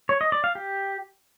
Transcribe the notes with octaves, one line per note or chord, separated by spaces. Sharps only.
C#5
D#5
D5
F5
G4